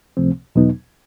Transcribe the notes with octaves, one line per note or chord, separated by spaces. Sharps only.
C#2 C3 F3 A3 C4
E2 B2 F#3 B3 D#4